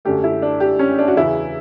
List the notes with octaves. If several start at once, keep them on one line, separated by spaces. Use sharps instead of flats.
F#2 D3 A3 G4
E4
D4
G4
C#4
D4
F#4
E2 C#3 E3 E4